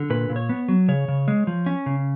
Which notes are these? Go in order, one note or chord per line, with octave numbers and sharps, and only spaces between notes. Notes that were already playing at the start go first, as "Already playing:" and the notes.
Already playing: D3
A#2 B4
A#2
C#5
B3
F#3
C#3 C#5
C#3
G#3
F3
C#4
C#3